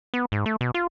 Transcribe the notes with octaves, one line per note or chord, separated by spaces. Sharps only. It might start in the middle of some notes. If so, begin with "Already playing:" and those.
B3
G#2
A3
B2
F4